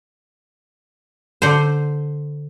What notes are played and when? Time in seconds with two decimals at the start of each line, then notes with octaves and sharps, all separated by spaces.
1.42 D3 C5